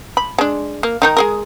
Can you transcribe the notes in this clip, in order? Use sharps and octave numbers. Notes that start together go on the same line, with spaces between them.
B5
G#3 D4
A#3
D#3 D#4 A#4
G#3 G#4 A#4